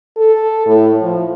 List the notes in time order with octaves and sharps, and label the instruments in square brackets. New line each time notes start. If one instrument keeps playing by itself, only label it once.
[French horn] A4
A2
F3